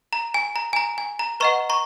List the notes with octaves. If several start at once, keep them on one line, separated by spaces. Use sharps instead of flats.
A#5
G#5
A#5
G#5
A#5
G#5
A#5
B4 D#5 F#5 A#5 C#6
A#5 C#6